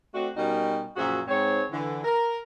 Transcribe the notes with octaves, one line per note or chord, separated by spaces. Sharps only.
A3 C4 D4 F#4
B2 G3 C#4 D#4 F#4 A#4
F#2 A#2 F3 F#4 G#4 E5
G#2 C4 C#5
D3 E3
A#4